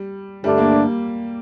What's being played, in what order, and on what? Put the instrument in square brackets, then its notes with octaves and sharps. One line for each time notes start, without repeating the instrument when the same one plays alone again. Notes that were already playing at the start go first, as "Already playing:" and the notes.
Already playing: [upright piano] G3
[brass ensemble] G2 D3 A3 D4 [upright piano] G3
[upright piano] A#3